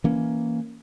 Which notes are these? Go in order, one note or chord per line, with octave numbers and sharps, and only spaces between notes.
E3 A#3 C#4